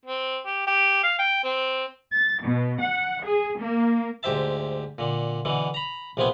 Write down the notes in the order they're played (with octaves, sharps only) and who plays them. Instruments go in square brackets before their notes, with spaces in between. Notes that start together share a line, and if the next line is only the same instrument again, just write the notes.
[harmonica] C4
G4
G4
F5
G5
C4
[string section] A6
B2
F#5
G#4
A#3
[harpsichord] D2 G#2 G4 C5 E5 A5
A#2 D3
B2 D3 E3
A#5 B5
A#1 C3 F3 B3 G#5